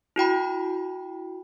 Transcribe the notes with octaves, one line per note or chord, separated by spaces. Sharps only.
E4 F#4 G5 B5